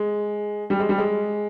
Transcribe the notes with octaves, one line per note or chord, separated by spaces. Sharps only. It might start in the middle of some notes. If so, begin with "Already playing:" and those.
Already playing: G#3
G3
G#3
G3
G#3